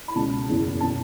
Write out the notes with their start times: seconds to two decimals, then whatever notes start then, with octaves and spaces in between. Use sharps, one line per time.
0.08 B5
0.16 C#2 B2 A5
0.49 F#1 E2 B2
0.81 B2 A5